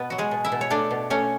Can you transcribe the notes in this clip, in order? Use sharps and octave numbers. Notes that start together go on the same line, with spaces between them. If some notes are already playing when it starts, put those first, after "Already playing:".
Already playing: B2 B3 B4
F#3 F#4
G#3 G#4
B2
E4 E5
B2
C#5
A3 D4 D5
B2
A3 C#4 C#5